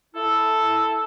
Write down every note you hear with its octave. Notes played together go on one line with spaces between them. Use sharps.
E4 A4